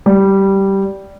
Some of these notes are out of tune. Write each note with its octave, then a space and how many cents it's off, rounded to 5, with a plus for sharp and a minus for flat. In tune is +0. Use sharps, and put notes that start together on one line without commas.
G3 -10